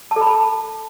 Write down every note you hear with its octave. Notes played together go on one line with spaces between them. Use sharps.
A5
A4
B5
A5